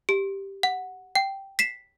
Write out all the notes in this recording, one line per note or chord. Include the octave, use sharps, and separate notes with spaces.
G4
F#5
G5
B6 C7 E7